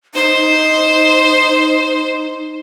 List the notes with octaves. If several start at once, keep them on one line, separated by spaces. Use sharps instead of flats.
D#4 C5